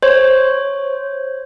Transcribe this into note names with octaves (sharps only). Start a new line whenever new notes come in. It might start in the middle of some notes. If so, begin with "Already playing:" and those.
C5 C#5